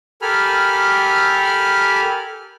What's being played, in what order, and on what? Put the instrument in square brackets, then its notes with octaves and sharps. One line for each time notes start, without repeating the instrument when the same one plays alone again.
[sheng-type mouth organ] G4 A4 A#4 G#5 B5 F6